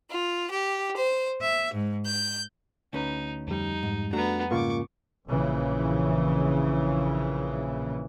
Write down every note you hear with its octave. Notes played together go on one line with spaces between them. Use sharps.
F4
G4
C5
E5
G#2
G6
D2 C#4 D#4 B4
F2 G3 D#4
G#2
A3 B3 D4 F#4 A#5
G#2 C#3 A#3 F4 A#4 C#6 D6
A#1 C#3 E3